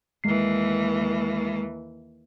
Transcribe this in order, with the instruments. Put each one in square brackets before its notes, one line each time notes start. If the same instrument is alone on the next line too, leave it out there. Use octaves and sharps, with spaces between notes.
[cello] D#2 E3 [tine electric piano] G#3 C7